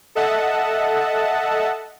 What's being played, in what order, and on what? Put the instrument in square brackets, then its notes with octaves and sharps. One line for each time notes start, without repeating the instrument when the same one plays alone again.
[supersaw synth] A4 D#5 E5 F#5 A5